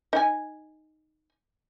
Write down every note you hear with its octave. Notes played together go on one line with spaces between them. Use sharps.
D#4 G#5